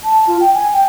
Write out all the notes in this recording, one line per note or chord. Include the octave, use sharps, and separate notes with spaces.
A5
F4
G5
G#5
G5